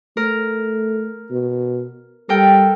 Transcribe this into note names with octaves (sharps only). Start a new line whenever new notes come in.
A3 A#4
B2
G3 A4 A#4 G5